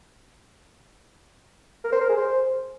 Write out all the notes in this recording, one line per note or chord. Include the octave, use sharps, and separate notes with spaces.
A#4
C5
A#4
G#4
C5